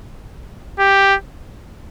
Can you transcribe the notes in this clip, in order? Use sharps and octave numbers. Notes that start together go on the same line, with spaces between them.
G4